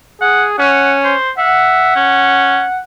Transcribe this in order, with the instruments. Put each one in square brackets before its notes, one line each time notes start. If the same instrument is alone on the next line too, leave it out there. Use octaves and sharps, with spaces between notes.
[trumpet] G#4 [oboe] F#5
[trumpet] C#4 [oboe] F#5
[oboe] C5
[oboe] E5 [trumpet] F#5
[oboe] C#4